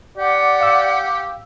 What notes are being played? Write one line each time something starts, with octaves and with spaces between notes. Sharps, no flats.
G4 D5 F#5
F5 E6